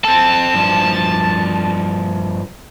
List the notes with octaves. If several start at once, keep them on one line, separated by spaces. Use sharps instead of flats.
C4 A4 A5
G2 F3